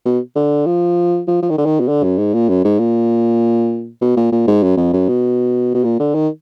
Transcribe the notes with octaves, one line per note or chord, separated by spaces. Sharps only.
B2
D3
F3
F3
F3
D#3
D3
D#3
B2
D3
F#2
G#2
A#2
F#2
G#2
A#2
B2
A#2
A#2
G#2
F#2
F2
F#2
B2
B2
A#2
D3
D#3